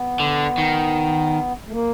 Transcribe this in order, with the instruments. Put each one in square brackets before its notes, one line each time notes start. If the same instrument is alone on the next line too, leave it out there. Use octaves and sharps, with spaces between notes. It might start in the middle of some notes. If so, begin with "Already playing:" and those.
Already playing: [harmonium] B3
[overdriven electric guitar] D3
D#3
[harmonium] A3
A#3